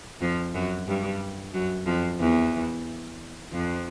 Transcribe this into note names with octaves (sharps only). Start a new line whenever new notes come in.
F2 F3
F#2 F#3
G2 G3
F#2 F#3
F2 F3
E2 E3
F2 F3